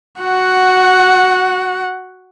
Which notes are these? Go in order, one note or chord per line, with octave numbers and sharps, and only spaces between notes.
F#4 F#5